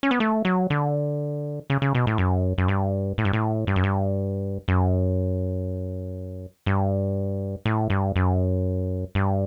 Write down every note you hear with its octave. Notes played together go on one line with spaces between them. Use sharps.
C#4
B3
A3
F#3
D3
C#3
C#3
B2
A2
F#2
F#2
G2
A2
G2
A2
G2
F#2
G2
F#2
G2
A2
G2
F#2
G2